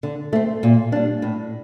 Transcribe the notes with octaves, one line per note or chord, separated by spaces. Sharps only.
D3
A3 C4
A#2
G3 D4
A2